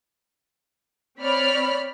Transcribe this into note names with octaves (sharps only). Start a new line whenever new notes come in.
C4 C#5 D5 B5 F6